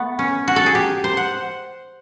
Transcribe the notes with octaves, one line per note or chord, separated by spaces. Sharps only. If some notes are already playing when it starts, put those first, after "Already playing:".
Already playing: A3 B3
C#4
F#4
A4
G#4
G4
C5
F#5